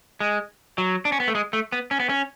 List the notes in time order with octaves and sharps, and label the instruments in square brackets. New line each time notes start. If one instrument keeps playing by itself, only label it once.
[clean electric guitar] G#3
F#3
D4
C#4
B3
A3
G#3
A3
B3
C#4
B3
C#4